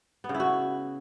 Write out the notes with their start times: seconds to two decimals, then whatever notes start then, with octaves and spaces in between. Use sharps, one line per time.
0.24 B3
0.29 C#3
0.35 E4
0.40 F#4